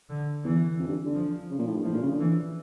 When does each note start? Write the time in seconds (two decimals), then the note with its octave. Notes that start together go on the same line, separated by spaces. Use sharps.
0.09 D3
0.44 E2 E3
0.79 F2
0.88 G2
1.05 D3
1.15 F3
1.50 C#3
1.59 A#2
1.67 A2
1.76 G2
1.84 A2 F3
1.93 A#2
2.02 C#3
2.11 D3
2.20 E3